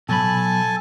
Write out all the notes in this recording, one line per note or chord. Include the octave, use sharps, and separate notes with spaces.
B2 F#3 A4 G#5 A5 B5